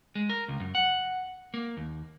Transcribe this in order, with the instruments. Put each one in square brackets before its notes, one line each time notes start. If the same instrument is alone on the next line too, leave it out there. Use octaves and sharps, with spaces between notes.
[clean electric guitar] G#3
A#4
C#2
F#2
F#5
A#3
D#2